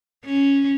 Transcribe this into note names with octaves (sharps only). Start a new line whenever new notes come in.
C#4